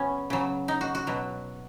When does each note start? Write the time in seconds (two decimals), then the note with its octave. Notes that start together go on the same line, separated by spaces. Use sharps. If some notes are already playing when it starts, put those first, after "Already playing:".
Already playing: C#3 F#3 B3 C#4
0.30 C#3 F#3
0.68 D#4
0.81 F#4
0.95 F#4
1.07 B2 F#3